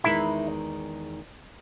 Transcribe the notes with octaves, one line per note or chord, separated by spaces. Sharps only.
E2 D#3 G#3 D#4 E4